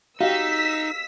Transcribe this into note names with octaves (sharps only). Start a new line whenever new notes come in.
D#4 F#4 G4 D#5 F5 E6 B6